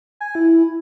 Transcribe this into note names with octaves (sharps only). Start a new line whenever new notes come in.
G#5
E4